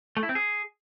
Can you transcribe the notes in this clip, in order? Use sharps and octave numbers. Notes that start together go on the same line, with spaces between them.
A3
E4
C4
G#4